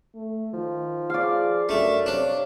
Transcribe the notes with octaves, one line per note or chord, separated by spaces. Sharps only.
A3
D#3 F3
G#4 D5 F5
F#2 A3 D4
C3 D4 C#5